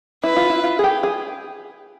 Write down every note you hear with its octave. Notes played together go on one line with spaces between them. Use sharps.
E4 B4
F4
E4
F4
G#4
G4
G#4